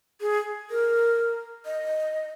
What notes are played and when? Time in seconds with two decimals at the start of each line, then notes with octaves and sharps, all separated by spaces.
0.21 G#4
0.70 A#4
1.66 D#5